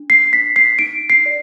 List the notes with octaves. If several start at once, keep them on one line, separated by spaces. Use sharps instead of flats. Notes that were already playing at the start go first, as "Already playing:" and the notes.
Already playing: D4
C7
D4 B6
C7
D#4 D7
C7
D5